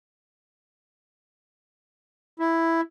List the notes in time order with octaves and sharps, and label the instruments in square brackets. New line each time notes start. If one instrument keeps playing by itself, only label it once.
[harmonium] E4